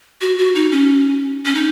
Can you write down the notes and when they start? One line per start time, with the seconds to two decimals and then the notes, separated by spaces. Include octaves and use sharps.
0.21 F#4
0.38 F#4
0.55 D#4
0.72 C#4
1.45 C#4
1.55 D#4